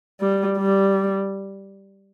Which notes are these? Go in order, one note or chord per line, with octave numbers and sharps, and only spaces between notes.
G3
G3